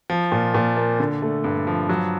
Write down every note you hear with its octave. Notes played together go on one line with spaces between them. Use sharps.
F3
A#2
A#2
A#3
D3
A3
G2
F3
F#3